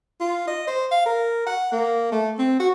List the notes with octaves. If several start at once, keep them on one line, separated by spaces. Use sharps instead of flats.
F4
D#5
C5
F5
A#4
F#5
A#3
A3
C4
F#4